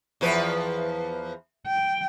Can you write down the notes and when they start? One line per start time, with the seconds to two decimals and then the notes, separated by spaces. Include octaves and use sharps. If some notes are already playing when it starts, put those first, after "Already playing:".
0.21 E2 F3 B4
1.67 G5